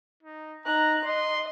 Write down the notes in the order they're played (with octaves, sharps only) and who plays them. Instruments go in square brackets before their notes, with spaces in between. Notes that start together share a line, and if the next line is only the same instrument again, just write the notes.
[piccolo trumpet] D#4
[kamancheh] D#4 F#6 [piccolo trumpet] A#5
[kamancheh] D#5 [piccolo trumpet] C6